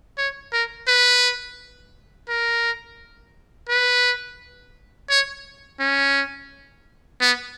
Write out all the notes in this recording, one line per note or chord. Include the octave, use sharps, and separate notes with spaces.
C#5
A#4
B4
A#4
B4
C#5
C#4
B3